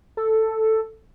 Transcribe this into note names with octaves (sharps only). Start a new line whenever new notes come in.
A4